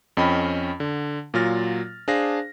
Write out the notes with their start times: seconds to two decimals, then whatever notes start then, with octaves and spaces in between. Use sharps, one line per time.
0.17 F2 C#4 D#5 G5 B5
0.80 D3
1.34 A#2 F#3 F4 F6 A6 A#6
2.08 D4 G#4 C5 F5 A#6